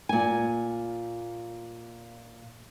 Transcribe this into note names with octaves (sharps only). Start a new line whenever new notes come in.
A#2 G#5